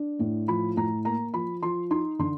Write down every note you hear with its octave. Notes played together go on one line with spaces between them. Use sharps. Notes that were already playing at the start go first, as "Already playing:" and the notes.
Already playing: D4
A2
F3 B5
A2 A#5
A#3 A#5
F3 B5
F3 C6
D#4 C6
D3 C6